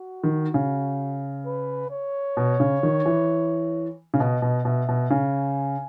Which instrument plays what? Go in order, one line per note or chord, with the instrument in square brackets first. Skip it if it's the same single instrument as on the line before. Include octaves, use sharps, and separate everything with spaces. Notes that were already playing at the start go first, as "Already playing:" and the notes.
Already playing: [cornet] F#4
[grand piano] D#3
C#3
[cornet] B4
C#5
[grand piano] B2
C#3
D#3
E3
C#3
[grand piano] B2 [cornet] D#5
[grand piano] B2
[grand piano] B2 [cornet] E5
[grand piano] B2
[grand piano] C#3 [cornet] G#5